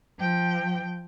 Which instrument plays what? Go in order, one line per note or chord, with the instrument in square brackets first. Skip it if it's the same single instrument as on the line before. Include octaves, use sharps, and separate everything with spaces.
[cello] F3 G5